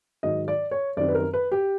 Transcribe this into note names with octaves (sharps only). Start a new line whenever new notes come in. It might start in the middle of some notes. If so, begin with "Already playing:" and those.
G#2 D#3 F#3 D#5
D5
C#5
F#2 D#3 G3 C4 D5
B4
A#4
B4
G4